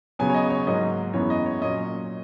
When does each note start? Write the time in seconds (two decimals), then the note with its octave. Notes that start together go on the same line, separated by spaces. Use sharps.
0.19 C#3 F#3 B3 G#5
0.30 C#5
0.34 D#5
0.50 C#5
0.67 G#2 F#3 A#3 D#5
1.13 F#2 E3 G#3 B3 C#5
1.30 D#5
1.46 C#5
1.61 A#2 F#3 C#4 D#5